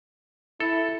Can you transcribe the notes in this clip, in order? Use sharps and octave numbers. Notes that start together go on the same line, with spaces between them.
E4 A4